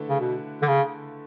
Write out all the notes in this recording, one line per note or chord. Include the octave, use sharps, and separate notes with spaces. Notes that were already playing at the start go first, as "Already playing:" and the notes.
Already playing: D3 A3 E4 B4
C#3
B2
D3
C#3